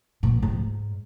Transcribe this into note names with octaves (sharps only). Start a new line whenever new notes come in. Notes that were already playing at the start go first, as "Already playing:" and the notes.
A#2
G#2